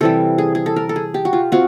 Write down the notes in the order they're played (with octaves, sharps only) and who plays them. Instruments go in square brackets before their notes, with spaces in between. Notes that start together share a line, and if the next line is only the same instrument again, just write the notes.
[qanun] C3 E3 G3 A4
G#4
G#4
A4
A#4
A4
G#4
G4
F#4
F4
C4 F4 F#4